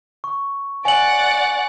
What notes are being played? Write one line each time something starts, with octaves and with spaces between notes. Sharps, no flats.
C#6
D5 F#5 G#5 F#7